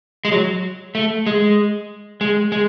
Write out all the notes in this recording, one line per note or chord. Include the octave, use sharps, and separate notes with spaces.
G#3
F#3
A3
G#3
G#3
G#3